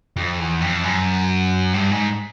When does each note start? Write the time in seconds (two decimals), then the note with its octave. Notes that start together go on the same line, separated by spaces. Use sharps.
0.16 F2
0.39 E2
0.61 F2
0.84 F#2
1.73 G2
1.90 G#2